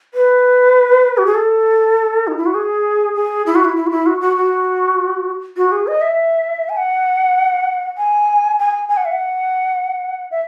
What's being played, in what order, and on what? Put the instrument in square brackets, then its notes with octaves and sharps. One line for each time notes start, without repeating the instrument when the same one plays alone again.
[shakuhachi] B4
F#4
G#4
A4
D#4
E4
F#4
G#4
G#4
E4
F#4
E4
E4
F#4
E4
F#4
F#4
F#4
F#4
G#4
D#5
E5
G#5
F#5
G#5
G#5
G#5
F#5
E5
F#5
E5